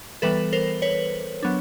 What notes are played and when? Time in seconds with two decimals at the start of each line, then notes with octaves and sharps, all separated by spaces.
0.22 E3 G3 B3 A4 B4
0.53 A#4 C5
0.82 B4 C#5
1.43 F#3 B3 D4